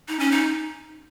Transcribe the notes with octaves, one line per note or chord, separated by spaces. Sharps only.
D#4
C#4
D#4